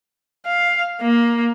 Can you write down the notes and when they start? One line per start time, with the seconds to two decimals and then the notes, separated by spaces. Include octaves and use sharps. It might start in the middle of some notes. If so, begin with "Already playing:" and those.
0.46 F5
1.01 A#3